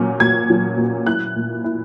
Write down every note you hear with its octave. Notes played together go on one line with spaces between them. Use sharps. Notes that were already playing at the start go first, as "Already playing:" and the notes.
Already playing: A#2 F#3 C#4
A#2 G#6
F#3
A#2
E4 F#6
A#2
E4